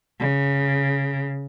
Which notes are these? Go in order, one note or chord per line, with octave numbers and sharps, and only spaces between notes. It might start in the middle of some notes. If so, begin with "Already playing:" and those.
C#3